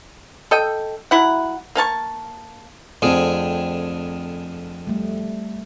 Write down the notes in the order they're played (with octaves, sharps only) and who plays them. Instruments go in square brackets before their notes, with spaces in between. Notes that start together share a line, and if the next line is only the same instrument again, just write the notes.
[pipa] A4 D#5 G5
F#3 E4 F#5
A#3 F5 A5 C#6
[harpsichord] F2 D3 G#4 [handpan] A3 C4
[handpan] G3 A3